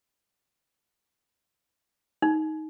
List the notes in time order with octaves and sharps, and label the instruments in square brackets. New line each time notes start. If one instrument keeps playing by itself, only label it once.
[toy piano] D#4